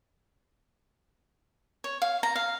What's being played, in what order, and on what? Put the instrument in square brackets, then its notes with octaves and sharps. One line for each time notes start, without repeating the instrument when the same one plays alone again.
[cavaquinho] C#5
F5
A#5
F5